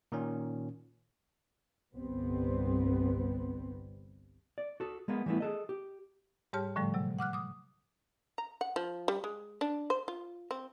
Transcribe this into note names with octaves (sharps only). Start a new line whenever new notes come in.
A#2 D#3 C#4
G1 C2 G3 B3 C4
D5
F#4 A4
G#3 A#3 B3 B4
E3 G3 A3 B3 E4
G#4 A4 D#5
G4
G#2 G3 G4 C#5 A5 F6
A2 D3 F3 G3 A3
C3 F#3
F#5 D6 F6 F#6
D6 D#6
A#5
F#5
F3
G3
G#3
D4
C5
F4
C4